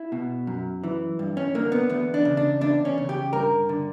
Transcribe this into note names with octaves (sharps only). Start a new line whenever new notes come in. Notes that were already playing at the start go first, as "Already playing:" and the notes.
Already playing: E4
B2
F#2
E3
G2
C#4
D3 A#3
B3
E2 B3
D4
C#3
D4
E2 D4
C#4
C#3
G4
G2 A#4
D3